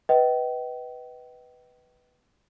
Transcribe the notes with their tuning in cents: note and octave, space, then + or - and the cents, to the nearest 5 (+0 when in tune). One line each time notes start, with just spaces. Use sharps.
B4 +0 D#5 +20 G5 -35